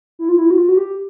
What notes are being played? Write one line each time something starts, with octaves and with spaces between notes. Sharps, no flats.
E4
F4
E4
F#4
F4
F#4
G4